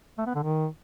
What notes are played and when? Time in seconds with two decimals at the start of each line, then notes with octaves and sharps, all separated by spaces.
0.18 A3
0.26 B3
0.35 D3
0.43 D#3